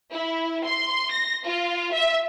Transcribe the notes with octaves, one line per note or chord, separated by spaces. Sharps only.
E4
C6
A#6
F4
E5